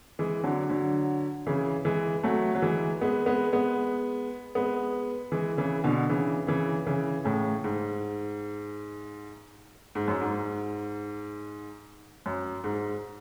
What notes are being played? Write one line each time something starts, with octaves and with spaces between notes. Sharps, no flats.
E3 G#3
D3 F#3
D3 F#3
C#3 E3
E3 G#3
F#3 A3
F#3
E3 G#3
G#3 B3
G#3 B3
G#3 B3
G#3 B3
E3 G#3
C#3 E3
B2 D3
C#3 E3
C#3 E3
C#3 E3
A2 C#3
G#2
G#2
F#2
G#2
F#2
G#2